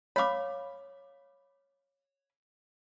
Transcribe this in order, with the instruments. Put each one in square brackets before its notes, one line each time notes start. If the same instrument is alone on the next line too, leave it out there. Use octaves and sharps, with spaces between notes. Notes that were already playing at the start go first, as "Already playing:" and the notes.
[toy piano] C#5 D6 [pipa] F5 B5